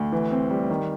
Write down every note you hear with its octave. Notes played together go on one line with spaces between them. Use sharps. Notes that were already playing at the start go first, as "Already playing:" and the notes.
Already playing: D2
E3
C4
G3
D#3